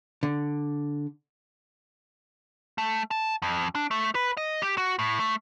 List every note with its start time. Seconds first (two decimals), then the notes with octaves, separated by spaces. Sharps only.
0.23 D3
2.78 A3
3.11 A5
3.42 F2
3.75 D4
3.91 A3
4.15 B4
4.37 D#5
4.62 G4
4.78 F#4
4.99 A2
5.20 A3